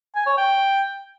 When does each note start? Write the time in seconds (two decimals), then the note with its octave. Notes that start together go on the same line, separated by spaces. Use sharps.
0.15 G#5
0.27 C#5
0.38 G5